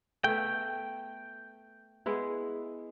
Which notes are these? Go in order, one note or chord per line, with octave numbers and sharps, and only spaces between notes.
A3 B3 G5
G#3 B3 E4